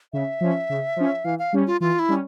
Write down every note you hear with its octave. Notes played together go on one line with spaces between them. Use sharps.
C#3 E5
F3 C#4
C#3
F3 C#4
E3 F5
F5
G3 C#4
F4
E3 F4
E4
G3 C#4